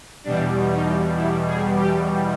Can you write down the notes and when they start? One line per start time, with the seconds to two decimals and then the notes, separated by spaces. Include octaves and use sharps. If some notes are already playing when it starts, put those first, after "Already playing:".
0.24 E2 B2 G3 D4
0.71 D#4
1.16 E4
1.47 G#4
1.78 G4